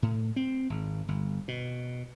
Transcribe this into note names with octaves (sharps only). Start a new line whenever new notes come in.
A2
C4
G#1
G1
B2